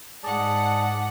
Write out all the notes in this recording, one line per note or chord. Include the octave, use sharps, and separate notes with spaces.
G#2 G#4 D5 F#5 A5